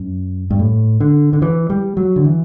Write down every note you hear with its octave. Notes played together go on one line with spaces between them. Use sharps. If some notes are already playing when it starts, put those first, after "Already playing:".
Already playing: F#2
G2
A2
D3
D3
E3
G3
F#3
D3
E3